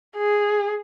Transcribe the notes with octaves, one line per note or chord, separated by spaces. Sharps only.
G#4